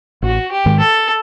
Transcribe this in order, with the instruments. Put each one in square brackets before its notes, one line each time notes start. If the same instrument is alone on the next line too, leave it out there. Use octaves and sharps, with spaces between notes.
[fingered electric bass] A1 [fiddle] F#4
[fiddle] G4
[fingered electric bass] G#2 D#3 G#3
[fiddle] A4